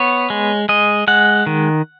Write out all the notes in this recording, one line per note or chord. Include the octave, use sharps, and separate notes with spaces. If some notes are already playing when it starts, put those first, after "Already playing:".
Already playing: B3 C#5
G#3
G#3 D#5
G#3 F#5
D#3